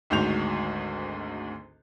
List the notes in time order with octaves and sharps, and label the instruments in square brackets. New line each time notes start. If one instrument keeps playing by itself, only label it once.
[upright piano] G#1 D2 G#2 F#4 G6 F7